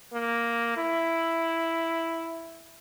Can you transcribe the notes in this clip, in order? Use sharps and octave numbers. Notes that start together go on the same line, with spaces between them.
A#3
E4